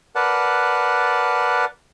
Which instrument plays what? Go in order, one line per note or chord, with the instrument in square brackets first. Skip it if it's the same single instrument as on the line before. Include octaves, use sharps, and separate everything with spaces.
[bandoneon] A#4 B4 D5 F#5 A5